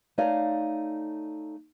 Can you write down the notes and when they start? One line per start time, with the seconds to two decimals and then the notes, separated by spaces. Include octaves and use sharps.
0.18 A3 D#4 C#5 D5 F5